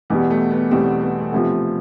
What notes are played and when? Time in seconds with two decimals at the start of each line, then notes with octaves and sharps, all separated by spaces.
0.10 E2 B2 G3 B3
0.30 A3
0.51 B3
0.71 E2 B2 G3 C4
1.01 B3
1.20 A3
1.32 D2 C3 F3 B3